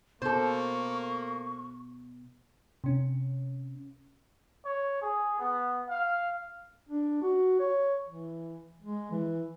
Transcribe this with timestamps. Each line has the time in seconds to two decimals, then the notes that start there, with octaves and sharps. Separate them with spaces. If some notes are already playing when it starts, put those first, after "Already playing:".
0.22 B2 A#3 A4 C5 C#6
2.84 C3 C#4
4.65 C#5
5.02 G#4
5.39 B3
5.89 F5
6.89 D4
7.22 F#4
7.60 C#5
8.08 E3
8.82 G#3
9.12 E3